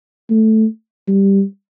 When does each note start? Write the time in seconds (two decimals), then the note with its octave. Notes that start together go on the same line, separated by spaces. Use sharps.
0.30 A3
1.08 G3